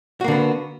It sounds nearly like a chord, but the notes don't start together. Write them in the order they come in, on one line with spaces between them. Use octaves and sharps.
F#4 A#3 D3 B3